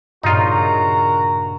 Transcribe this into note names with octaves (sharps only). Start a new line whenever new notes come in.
G2 A#2 C#3 D#4 F4 F#4 A#4 A#5